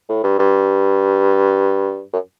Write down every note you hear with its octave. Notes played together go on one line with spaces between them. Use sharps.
A2
G2
G2
F#2